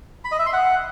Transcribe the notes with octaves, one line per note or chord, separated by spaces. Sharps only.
B5
D#5
E5
C6
F#5